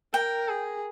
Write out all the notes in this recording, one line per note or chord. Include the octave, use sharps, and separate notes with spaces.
A#4 G5
G#4